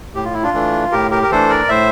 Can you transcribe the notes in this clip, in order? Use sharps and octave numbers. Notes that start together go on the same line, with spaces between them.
A2 G4
F4
E4
D4 F4
E3 A3 D4
A2 G4 A#4
G4 A#4
A#4
E3 A3 D4 A4 C5
A#4 D5
A2 C5 E5